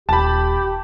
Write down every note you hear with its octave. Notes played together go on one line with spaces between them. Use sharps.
D#1 G4 A5 B5